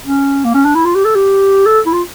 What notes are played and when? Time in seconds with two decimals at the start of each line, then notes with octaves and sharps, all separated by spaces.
0.04 C#4
0.45 A#3
0.54 C#4
0.65 D4
0.75 E4
0.85 F4
0.95 G4
1.05 A4
1.15 G4
1.66 A4
1.86 E4
1.93 F4